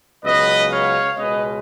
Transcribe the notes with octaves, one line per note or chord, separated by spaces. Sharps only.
C#2 C#3 F#3 B3 B4 D#5
C#5 F5
C#2 B2 G#3 C#4 B4 D#5